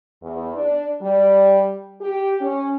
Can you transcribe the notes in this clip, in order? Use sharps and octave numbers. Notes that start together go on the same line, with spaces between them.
E2
D4
G3
G4
C#4